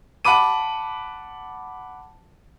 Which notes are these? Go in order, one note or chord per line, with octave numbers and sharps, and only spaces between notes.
F#5 A5 B5 D6 D#7